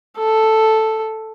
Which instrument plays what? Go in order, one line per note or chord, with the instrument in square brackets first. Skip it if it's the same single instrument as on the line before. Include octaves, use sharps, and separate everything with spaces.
[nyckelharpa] A4